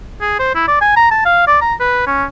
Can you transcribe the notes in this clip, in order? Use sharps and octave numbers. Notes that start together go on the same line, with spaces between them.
G#4
C5
E4
D5
G#5
A#5
A5
F5
D5
A#5
B4
C#4